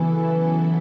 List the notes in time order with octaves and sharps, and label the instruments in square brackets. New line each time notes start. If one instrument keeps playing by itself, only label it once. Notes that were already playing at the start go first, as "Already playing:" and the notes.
Already playing: [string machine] C#3 F#3 B3 E4 A4 [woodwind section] E3